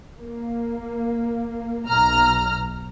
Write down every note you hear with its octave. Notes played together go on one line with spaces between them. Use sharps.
A#3
B1 A#5 F6